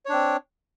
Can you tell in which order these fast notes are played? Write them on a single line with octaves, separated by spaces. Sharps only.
C#5 D4 C4